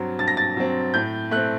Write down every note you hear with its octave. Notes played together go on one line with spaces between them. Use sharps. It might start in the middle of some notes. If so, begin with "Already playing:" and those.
Already playing: G2 F#3 C4
G2 A6
A#6
A6
F#3 C4
A2 G6
A3 C4 F#6